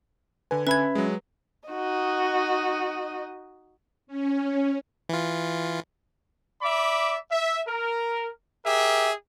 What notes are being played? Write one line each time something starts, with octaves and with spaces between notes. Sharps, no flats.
D3 B4 G#5
C#4 B4 E5 B5 G#6
F#3 G#3
D#4 F#4 D#5
C#4
E3 F4
D5 E5 B5 D6
E5
A#4
G4 G#4 A#4 E5